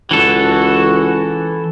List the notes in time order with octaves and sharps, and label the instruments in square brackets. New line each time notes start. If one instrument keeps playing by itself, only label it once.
[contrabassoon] C#2 [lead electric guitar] E3 A4 [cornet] F#4